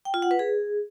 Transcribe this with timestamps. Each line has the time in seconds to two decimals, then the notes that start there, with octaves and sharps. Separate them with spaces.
0.05 G5
0.14 F4
0.22 F#5
0.31 B4
0.39 G#4